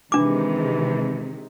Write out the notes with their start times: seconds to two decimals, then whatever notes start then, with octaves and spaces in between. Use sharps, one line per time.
0.12 C3 D#3 E3 G#3 D4 D6